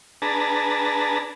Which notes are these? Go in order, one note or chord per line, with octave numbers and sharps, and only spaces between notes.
D4 G#4 B4 A5 A#5